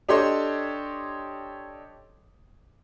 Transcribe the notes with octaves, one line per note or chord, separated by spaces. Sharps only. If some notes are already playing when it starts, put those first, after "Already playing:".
D4 G4 A4 C#5 D#5 C6